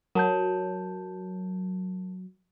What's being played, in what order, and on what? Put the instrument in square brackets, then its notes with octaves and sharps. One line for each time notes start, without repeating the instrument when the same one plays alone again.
[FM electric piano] F#3 [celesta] A#4 A5 G6